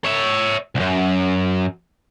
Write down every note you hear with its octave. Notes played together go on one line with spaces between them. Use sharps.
C#5 E5
C2 F#2